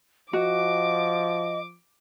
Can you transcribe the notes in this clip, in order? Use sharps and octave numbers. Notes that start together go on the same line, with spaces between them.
F3 F#4 D#5 D6